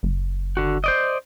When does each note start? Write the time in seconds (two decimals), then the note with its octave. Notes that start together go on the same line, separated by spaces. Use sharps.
0.03 F#1
0.57 D3 F#4
0.84 C5 D5 D#5